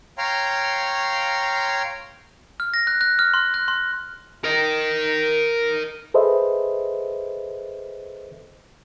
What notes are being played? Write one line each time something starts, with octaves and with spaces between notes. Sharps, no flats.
C#5 F5 G5 A#5 C6
F6
A#6
F#6
F#6
F6
C6
F#6
C6
A#4 D#5
G#4 A4 B4 C5 D#5 E5